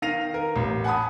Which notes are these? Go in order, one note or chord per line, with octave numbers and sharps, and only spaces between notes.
D#3 F5 A#6 D#7 F7
A#4
A1
F#5 G#5 A5 B5 D#6